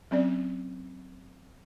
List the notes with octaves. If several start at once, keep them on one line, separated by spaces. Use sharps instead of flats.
F#3 C4 C#4 D5